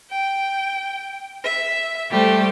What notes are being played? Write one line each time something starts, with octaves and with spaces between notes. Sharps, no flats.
G5
E5
G3 A3 G4 C5